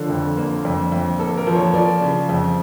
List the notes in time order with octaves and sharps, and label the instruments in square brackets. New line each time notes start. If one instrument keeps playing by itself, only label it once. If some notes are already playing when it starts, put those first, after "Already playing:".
Already playing: [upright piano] D3 F3 A4 A#4 C#5
F2
A#3
F2
F2
A#3 A4
A#4
F3
C#5
F3 D5
C#3
F2